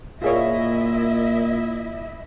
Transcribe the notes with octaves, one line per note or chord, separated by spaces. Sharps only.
A#2 E4 F4 G#4 C#5 D#5 E5